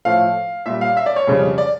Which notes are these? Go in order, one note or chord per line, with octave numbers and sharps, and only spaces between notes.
A2 F3 A3 F5
A#2 G3 E5
F5
E5
D5
C#5
F2 C#3 G3
D5